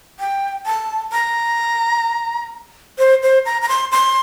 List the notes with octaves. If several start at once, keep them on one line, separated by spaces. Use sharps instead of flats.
G5
A5
A#5
C5
C5
A#5
A#5
C6
C6